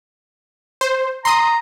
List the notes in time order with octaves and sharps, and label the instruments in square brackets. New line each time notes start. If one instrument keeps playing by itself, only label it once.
[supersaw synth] C5
[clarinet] A#5 [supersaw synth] C6 D#6